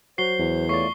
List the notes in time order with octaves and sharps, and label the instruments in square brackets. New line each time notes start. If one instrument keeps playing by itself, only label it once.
[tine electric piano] F#3 F#4 [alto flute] C5 [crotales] C7 G7
[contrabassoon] E2
[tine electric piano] A3 F4 D5 [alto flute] C#5 [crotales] C#6 C7